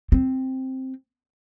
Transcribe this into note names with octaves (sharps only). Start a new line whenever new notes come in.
C4